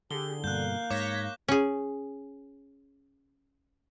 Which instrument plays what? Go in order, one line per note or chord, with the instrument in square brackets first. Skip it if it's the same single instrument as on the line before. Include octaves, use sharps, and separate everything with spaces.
[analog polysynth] D3 [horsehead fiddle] G4 G#4 [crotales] G7
[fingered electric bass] G2 B2 [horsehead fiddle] A#3 F5 [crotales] F#6 G6
[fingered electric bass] G#2 [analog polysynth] C#5 A#6 B6 [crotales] D6
[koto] C#4 G#4